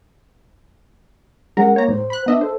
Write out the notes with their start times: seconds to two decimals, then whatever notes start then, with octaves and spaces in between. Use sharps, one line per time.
1.57 G#3 C#4 A#4 F#5
1.76 A#3 C#5 A#5
1.88 A2 C5
2.10 B5 F#6
2.26 B3 D4 D#5 E5
2.41 A4 C5